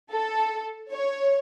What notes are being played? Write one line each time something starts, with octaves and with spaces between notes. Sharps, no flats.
A4
C#5